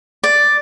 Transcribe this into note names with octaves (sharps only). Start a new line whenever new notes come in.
D5